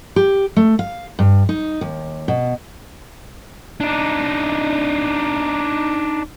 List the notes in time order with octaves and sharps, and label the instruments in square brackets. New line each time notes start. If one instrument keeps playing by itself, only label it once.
[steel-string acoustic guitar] G4
A3
F5
G2
D#4
D#2
B2
[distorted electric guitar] D4 D#4